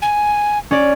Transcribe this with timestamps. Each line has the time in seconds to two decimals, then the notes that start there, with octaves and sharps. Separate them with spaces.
0.02 G#5
0.71 C#4 D5